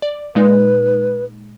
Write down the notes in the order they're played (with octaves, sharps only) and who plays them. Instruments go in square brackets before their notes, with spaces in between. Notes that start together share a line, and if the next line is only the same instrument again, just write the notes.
[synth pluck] D5
[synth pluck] A#2 G#3 D#4 [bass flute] B4